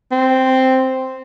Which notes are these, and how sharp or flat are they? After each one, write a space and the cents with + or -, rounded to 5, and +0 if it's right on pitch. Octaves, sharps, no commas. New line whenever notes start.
C4 -5